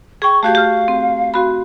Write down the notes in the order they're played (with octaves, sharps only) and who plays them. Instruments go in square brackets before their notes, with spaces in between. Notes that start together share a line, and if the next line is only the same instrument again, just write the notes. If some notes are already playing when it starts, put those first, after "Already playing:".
[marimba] G#4 G5 [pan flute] C#6
[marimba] A3 F#4 G4 [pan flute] F5
[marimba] G4 F6
C4
C4 F#4 B5